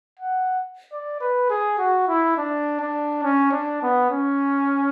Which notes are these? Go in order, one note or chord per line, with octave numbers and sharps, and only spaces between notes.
F#5
D5
B4
G#4
F#4
E4
D4
D4
C#4
D4
B3
C#4